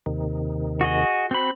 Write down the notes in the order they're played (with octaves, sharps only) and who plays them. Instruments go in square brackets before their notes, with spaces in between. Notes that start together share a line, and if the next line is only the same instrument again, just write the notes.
[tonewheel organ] D#2 C3 D#3
[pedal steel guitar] F#4 G#4 D#5
[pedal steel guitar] C4 B5 [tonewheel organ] F#4 C5